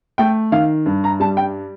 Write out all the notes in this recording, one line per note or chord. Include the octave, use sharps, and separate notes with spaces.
A3 G5
D#3 F5
G2
A#5
G3 A5
G5